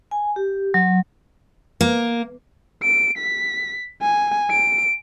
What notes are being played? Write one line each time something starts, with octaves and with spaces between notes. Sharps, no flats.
G#5
G4
F#3
A#3
D7
B6
G#5
D7